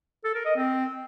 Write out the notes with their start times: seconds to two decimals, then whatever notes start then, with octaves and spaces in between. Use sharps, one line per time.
0.24 A4
0.35 A#4
0.45 D#5
0.56 C4